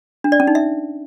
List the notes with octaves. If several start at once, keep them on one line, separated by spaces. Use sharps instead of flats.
D4
D5
C#4
D#4
E5